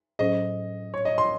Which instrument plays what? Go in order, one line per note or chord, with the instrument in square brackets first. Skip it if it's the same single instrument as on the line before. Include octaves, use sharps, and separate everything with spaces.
[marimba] A2 F#3 C#4 G#4 C5 [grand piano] D#5
[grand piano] C#5
D#5
C6